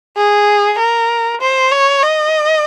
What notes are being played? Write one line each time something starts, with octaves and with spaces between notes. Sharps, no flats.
G#4
A#4
C5
C#5
D#5